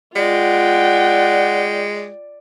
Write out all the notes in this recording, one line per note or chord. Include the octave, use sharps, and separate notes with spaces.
G#3 F4 D5 F#5 G5